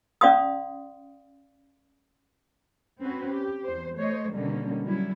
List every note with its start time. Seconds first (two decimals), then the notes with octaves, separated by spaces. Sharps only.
0.21 C#4 D5 F5 C6 D#6
3.00 C4 C#4 F#4 B4
3.30 G4
3.65 E2 C5
3.96 A3 C5 C#5 D#5
4.32 B2 D3 D#3 G3 A#3 C#4
4.83 F#3 G3 C#4 E4